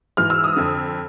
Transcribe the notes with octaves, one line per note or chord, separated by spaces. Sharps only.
G#2 E3 F6
E6
D#6
F2 D3